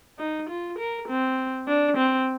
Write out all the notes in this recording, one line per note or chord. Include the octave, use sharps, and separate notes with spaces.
D#4
F4
A#4
C4
D4
C4